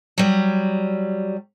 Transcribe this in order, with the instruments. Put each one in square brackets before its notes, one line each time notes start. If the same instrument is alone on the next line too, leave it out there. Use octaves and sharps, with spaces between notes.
[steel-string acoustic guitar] F#3 G3